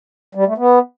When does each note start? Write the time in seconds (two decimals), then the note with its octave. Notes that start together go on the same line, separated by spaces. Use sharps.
0.35 G3
0.46 A3
0.58 B3